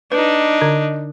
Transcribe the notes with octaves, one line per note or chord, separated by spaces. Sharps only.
D4 D#4 B4
D3